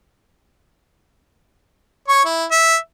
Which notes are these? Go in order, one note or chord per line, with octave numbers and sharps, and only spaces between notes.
C#5 C#6
E4
E5